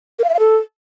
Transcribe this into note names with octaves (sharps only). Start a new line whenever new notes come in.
A#4
F5
E5
F5
A4